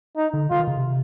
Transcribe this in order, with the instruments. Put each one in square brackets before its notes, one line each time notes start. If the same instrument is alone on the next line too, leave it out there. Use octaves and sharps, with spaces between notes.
[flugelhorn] D#4
[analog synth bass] D3
[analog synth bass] D3 [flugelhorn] F4
[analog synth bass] D#3
C#3
C3